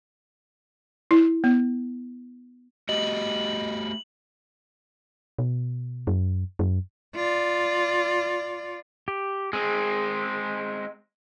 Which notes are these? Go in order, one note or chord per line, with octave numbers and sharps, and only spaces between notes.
E4
B3
A3 F#4 G4 D#5 F#7
B2
F#2
F#2
F4 D5
G4
G#3 C4 G#4